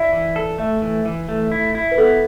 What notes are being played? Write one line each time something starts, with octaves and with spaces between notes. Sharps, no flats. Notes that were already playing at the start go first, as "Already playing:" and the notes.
Already playing: E4 D5 E5
E3
A4
A3 E5
E3
E3
A3
E4
E4
B4
B3 A4